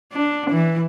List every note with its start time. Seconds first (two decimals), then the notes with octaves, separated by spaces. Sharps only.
0.13 D4
0.50 E3